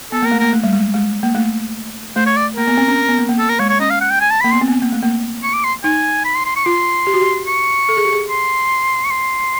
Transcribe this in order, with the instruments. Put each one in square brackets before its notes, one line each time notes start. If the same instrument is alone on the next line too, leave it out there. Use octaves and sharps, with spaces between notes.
[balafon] B3 [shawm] A4
[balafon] A#3 [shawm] A#4
[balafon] A3
[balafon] A#3 [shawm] A#4
[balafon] A3
G3
G#3
G#3
A#3
A3
[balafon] A3 [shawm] C5
[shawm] C#5
D5
[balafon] A#3 [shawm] A#4
[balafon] B3
C4
C#4
B3
A#3
A#3
[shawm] A4
A#4
[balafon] G#3 [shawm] C#5
[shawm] C#5
[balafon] C#4 [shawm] D#5
[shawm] F5
F#5
G5
G#5
A5
[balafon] A#3 [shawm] B5
[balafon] B3 [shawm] C6
[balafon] C4
B3
C4
A#3
A3
A#3
[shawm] C#6
D6
C6
[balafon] D#4 [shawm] G#5
[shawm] B5
C6
C6
C#6
[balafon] F4 [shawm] C6
[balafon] G4
F#4
G4
[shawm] C#6
[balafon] A4
G#4
G4
G#4
[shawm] C6
C#6
C6